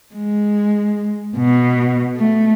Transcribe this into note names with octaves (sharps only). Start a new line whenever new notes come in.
G#3
B2
A3